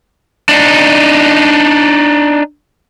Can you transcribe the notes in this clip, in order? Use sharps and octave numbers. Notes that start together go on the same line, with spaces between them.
D4 D#4